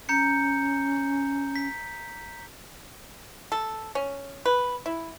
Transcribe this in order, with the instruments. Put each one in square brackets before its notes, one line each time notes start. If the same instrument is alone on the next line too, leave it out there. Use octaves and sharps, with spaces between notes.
[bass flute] C#4 [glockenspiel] A#5 G6 C#7
[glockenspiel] B6
[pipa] A4
C#4
B4
E4